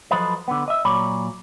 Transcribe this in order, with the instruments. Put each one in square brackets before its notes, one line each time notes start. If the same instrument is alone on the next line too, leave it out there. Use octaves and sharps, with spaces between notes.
[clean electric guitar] F3 F#3 A4 B4 C5 D#5
D3 B3
D#5 E5
A#2 F#3 C#5 D5 B5